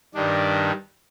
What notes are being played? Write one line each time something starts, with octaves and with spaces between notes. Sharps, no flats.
G2 D#3 G3 D4